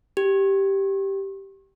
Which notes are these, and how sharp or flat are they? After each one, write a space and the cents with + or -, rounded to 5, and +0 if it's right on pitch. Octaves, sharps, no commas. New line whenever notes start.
G4 -5